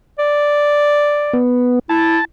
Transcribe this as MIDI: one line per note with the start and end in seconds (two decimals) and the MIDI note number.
0.19 1.39 74
1.33 1.79 59
1.89 2.18 64
1.89 2.25 81